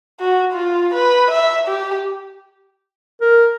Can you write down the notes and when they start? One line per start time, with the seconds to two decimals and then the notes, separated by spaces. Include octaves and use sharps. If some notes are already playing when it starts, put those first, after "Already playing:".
0.20 F#4
0.53 F4
0.94 B4
1.31 E5
1.68 G4
3.21 A#4